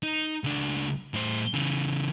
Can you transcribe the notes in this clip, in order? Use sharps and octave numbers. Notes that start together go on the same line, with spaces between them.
D#4
C#2 D4
A2 C5
C#3 E3